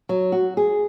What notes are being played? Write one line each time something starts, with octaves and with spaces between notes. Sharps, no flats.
F#3
F#4
G#4